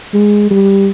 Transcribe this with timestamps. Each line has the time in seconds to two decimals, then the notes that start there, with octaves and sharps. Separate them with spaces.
0.14 G#3
0.50 G3